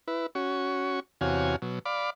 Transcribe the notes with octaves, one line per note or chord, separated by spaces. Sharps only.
E4 B4
C#4 F#4 C#6
E2 C3 F#4 C#5 F5 G#5
B2 F#3
D5 F5 B5 D6